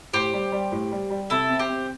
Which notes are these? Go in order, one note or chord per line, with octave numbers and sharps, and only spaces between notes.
A2 G4 C5
G3
G3
A2
G3
G3
C3 E4 A4
C4
G4 C5
C4